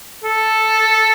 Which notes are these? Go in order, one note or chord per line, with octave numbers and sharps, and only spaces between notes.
A4